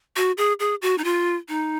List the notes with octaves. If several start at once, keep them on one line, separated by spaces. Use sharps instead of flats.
F#4
G#4
G#4
F#4
D#4
F4
D#4